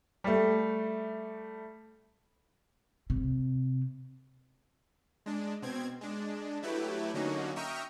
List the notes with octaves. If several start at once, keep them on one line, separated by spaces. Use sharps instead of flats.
G3 A3
C3
G#3 D4
B2 C4 G#6
G#3 D4
F#3 A3 E4 G4 B4
D3 F#3 A#3 C#4 D#4 F#4
E5 G5 A#5 C#6 D#6 F6